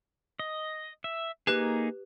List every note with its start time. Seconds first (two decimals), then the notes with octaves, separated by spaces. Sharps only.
0.39 D#5
1.04 E5
1.47 A#3 D#4 G4 G#4 B4 F#6